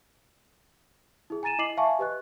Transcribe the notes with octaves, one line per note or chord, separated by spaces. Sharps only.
E4 G#4
G#5 A#5 A6 D#7 E7
E4 D#5 D6 C7 F#7
E5 F5 G#5 A5 C#6
G4 B4 D#5 F#6